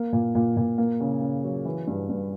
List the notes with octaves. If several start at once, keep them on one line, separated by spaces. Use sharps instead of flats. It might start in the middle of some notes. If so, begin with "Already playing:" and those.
Already playing: A#3
A#2
A#2
A#2
A#3
C#3
C#3
F#3
E3
G2
G2